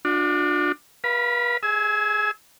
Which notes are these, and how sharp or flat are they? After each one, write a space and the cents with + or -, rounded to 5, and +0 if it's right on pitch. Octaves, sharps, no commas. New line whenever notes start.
D4 +15 F#4 -45
B4 -40 F5 +0 B5 +0
G#4 +0 G#5 +25 E6 -30